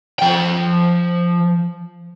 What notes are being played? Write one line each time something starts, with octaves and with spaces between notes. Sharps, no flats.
F3 G5